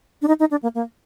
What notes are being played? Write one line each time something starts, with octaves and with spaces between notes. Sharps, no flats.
D4
D#4
D#4
D4
A#3
A#3